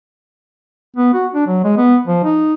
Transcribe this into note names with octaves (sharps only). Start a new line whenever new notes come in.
B3
F#4
D4
F#3
G#3
B3
F3
D#4